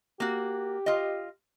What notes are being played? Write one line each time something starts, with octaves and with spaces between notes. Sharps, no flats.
A#3 F#4 G4
F4 D#5